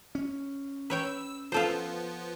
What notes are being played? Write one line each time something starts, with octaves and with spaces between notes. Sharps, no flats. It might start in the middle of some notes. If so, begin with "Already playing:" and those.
C#4
B4 C#5 G5 E6
F3 B3 F4 A4 C5